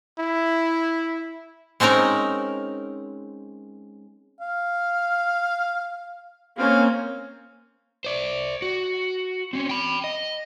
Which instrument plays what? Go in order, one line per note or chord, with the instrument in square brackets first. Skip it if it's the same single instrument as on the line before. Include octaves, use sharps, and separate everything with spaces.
[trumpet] E4
[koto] G#3 C4 C#4 D#4 A#4
[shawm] F5
[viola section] A#3 C4 C#4 [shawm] F5
[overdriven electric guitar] C5 D5
F#4
C4 C#4
G5 B5
D#5